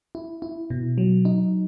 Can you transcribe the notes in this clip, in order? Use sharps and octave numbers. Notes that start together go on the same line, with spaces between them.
E4
E4
B2
F#3
D#4